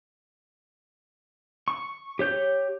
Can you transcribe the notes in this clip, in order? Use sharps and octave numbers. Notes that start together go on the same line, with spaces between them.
C#6
G4 C#5 G6